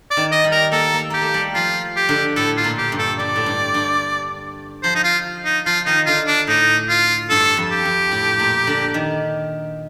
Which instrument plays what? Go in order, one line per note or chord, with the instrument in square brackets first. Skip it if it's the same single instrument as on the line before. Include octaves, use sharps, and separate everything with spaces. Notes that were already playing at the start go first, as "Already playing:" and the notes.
[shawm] D5
[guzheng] D#3
[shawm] D#5
[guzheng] G3
[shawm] A#4
[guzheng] A#3 [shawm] A4
[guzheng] A#3
[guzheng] A#3 [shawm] G4
[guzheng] A3
G3
[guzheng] F3 [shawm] F4
[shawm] G4
[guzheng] D3
[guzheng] A2 [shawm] A4
[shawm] F4
[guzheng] A#2
[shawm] G4
[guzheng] G2
[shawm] A4
[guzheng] G2 [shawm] D5
[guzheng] A2
G2
G2
[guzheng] F3 [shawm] C5
[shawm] D#4
F4
D#4
[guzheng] F3 [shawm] F4
[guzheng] D#3 [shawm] D#4
[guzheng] D3 [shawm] F4
[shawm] D4
[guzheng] A2 [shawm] D#4
[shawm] F4
[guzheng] G2 [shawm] A4
[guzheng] F2
[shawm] G4
[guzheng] F2
A2
A#2
D3
D#3